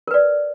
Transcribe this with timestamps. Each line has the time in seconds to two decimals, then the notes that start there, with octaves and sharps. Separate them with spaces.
0.08 A#4
0.11 B4
0.14 D5